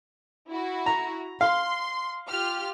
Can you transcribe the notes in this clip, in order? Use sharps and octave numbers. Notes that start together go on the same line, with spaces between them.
E4 F#4
A#5
F5 C6
F4 G4 F6